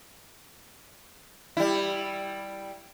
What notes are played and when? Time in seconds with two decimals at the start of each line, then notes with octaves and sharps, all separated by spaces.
1.57 G3 E4